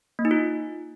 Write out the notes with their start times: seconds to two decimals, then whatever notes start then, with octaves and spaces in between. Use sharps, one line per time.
0.19 A#3
0.25 D#4
0.31 F4